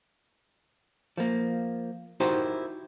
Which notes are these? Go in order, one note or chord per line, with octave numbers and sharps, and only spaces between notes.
F3 A#3
D#4 E4 F#4 G4 A#4 C5